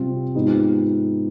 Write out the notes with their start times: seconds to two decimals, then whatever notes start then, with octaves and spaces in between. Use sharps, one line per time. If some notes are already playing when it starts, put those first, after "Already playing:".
Already playing: C3 G3 C4 F4
0.35 G#2 F3 B3 D#4 G4